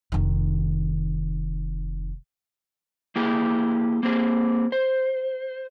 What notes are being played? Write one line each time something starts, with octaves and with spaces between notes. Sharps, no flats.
F1 D#3
A#3 E4 G4 G#4
A#3 C4 G#4
C5